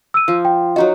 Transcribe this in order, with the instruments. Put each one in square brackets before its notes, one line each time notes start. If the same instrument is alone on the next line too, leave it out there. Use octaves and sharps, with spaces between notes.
[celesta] E6 D#7
[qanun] F3
[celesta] G5
[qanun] F#3 D#4 F#4 [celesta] D#5